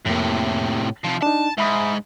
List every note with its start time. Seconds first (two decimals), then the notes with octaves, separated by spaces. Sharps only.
0.06 F2 A2 C3 A#3
1.05 C3 F3
1.23 D4 D#4 A5
1.58 G#2 E5 B5 D#6